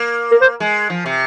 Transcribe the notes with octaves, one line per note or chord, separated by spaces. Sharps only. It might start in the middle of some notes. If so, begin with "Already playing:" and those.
Already playing: A#3
A#4
C5
G#3
F3
C3